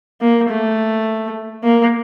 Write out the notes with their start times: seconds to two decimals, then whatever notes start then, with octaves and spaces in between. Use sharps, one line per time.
0.21 A#3
0.49 A3
1.64 A#3